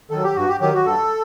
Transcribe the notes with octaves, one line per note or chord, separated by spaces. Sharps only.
D#3 F#3 A4
G4
G2 F#4
G4
D#3 F#3 G4
F#4
G2 A4